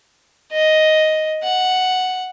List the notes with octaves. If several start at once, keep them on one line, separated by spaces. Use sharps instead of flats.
D#5
F#5